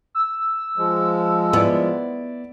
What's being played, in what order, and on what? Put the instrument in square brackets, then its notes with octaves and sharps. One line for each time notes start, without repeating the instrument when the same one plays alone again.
[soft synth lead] E6
[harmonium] F3 G#3
[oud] B3 [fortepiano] E4 D5